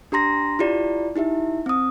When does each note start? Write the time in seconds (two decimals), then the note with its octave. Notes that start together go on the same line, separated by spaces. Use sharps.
0.12 D4 G4 A#5 C6 A#6
0.59 E4 F4 G4 D5
1.16 D#4 E4 G4 E5
1.66 C4 D#6